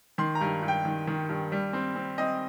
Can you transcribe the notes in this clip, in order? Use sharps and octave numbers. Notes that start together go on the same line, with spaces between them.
D#3 C6
A#5
G2
G2
G5
D#3
D#3
G2
G3
C4
C4
C4 D#5